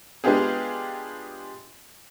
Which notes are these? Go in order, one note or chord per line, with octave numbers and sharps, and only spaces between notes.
G#3 B3 D4 F4 G4 G#4